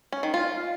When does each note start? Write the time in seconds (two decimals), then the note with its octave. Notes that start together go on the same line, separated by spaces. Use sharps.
0.12 C#4
0.23 D#3
0.34 F4